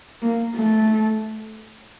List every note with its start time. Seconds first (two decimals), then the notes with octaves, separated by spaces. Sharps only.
0.22 A#3
0.56 A3